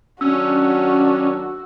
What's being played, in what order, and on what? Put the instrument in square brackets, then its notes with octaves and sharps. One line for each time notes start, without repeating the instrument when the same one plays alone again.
[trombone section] D#2 F#3 D4 [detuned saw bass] C#4 [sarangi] F#4 [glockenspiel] E6